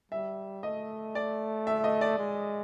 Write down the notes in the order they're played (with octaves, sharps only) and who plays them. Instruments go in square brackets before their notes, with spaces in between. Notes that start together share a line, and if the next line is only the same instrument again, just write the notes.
[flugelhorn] G3 [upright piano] E5
[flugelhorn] A3 [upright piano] D#5
[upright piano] D5
E5
D#5
D5
[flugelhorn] G#3